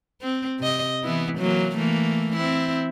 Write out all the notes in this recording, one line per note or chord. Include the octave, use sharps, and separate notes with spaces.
C4
C3 D#5
E3 B3 E4
E3 F#3 A#3
E3 A3 A#3
C4 E4